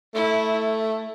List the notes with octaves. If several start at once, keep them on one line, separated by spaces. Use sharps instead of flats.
A3 E4